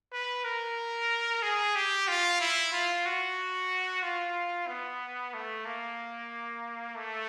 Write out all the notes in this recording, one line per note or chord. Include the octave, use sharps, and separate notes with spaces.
B4
A#4
G#4
G4
F4
E4
F4
F#4
F4
B3
A3
A#3
A3